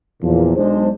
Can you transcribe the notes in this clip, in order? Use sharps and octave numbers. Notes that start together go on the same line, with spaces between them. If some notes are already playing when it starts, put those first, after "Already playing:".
E2 A#2 F3
B1 G#3 D4 C5